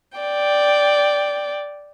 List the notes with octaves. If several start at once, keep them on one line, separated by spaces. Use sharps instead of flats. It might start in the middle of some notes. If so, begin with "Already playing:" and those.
D5 G5